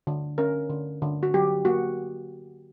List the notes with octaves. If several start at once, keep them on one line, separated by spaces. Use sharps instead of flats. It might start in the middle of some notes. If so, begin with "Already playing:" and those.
D3
C#4 A#4
D3
D3
F#4
F#3 G4
A#3 F#4